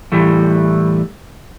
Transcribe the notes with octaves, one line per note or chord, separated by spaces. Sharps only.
A2 E3 G3 A3